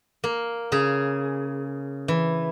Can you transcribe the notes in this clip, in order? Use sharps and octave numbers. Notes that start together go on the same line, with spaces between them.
A#3
C#3 G#4
E3